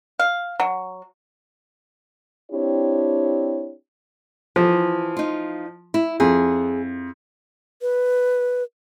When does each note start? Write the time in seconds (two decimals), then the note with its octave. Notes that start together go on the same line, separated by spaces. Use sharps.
0.19 F5
0.60 F#3
2.51 C4 D4 E4 G4 C#5
4.56 E3 F3
5.17 D#4 F4
5.94 E4
6.20 F2 G#4
7.82 B4